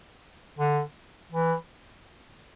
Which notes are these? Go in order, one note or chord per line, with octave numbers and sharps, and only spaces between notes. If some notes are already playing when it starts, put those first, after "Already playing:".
D3
E3